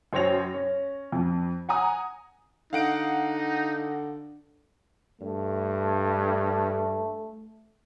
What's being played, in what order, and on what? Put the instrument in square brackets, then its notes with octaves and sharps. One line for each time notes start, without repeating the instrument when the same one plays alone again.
[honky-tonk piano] F#2 C5 C#5 G5 A#6 F7
C#4
F2
F#5 G#5 A#5 D#6
[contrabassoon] D3 [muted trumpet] D#4 [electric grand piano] F5 F#5 D7
[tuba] G2 [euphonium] A3